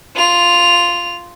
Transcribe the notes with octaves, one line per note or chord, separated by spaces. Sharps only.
F4 F7